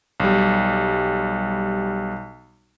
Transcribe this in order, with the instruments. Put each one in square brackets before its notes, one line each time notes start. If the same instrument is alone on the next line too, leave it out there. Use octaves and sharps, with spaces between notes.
[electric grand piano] B1 G3